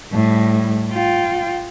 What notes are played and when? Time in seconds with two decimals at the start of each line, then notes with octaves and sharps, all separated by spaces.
0.12 A2 G3
0.92 F4 G5